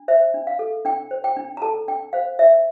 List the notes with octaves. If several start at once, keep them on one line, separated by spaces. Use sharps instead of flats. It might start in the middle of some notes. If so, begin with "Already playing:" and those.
Already playing: D4
C5 E5
D4
F5
A4
D4 G5
C5
G5
D4
A#5
A4 A5
D4 G5
C5 F5
C5 E5